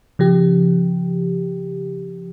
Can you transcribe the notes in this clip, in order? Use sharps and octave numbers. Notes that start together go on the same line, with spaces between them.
C#3 F3 G4